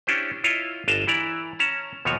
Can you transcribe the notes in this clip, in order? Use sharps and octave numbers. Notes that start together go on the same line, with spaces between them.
C#4 D4 E4 G4 C5
E4 F4 C#5 D#5 F5
G1 D4 D#5 F5 G#5 A5
E3 E4 D5 A#5
C#4 A5 A#5
D#2 B2 F3 F#4 C#5